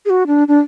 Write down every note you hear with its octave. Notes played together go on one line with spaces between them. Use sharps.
G#4
F#4
D4
D4